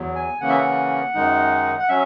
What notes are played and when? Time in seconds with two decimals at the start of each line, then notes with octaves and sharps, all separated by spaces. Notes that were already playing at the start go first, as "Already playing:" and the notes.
Already playing: E2 F#3
0.15 G#5
0.41 C#3 E3 A#3 C#4 F#5
0.49 E5
0.58 F#5
1.14 F#2 D#3 G#3 D#4
1.79 F#5
1.89 F#3 C#4 E5